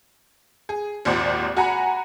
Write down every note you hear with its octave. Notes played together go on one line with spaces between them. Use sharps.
G#4
G#1 D#2 A#2 C5 D5 F#5
F#4 F#5 G#5 A#5 B5